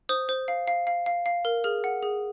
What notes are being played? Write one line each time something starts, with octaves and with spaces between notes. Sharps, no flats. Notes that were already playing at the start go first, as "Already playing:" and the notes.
C5 D#6
C5
F5
F5
F5
F5
F5
A#4
G#4 F6
F#5
G#4